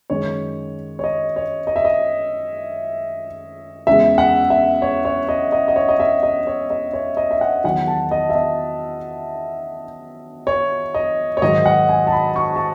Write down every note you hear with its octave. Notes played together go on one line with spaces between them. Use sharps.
F#2 D#3 G#3 C#5
C#5
D#5
C#5
D#5
E5
D#5
E2 C#3 G#3 E5
F#5
E5
C#5
C#5
D#5
D#5
D#5
C#5
D#5
E5
D#5
C#5
D#5
C#5
D#5
E5
F#5
E2 D#3 F#3 F#5
A5
D#5
E5
D#5
C#5
D#5
C#5
G#2 D#3 F#3 D#5
F#5
G#5
A5
B5
C#6
A5